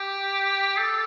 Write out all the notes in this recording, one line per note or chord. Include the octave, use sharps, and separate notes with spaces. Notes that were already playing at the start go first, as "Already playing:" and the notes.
Already playing: G4
A4